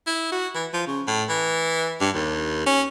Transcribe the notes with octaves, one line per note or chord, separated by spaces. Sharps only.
E4
F#4
E3
F3
C#3
A2
E3
G2
D#2
C#4